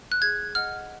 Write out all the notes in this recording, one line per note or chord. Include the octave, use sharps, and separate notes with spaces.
F#6
G#4 G#6
D#5 F#5 F6